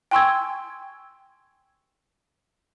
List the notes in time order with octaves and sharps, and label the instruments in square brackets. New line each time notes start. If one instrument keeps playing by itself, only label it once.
[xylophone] G5 G#5 C6 C#6 E6 G#6